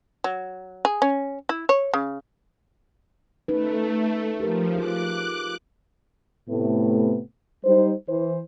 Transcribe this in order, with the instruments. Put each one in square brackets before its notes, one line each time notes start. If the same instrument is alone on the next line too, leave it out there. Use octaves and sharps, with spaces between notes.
[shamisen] F#3
G#4
C#4
E4
C#5
C#3
[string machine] A3 [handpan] C#4 D#4 B4
[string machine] F3 [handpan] G4 A#4
[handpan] F4 G#4 [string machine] D6 F#6
[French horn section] A2 C3 A3 B3
G3 D#4 C5
E3 C5